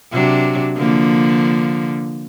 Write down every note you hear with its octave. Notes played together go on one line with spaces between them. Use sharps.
C3 F#3 D4
D3 F3 A#3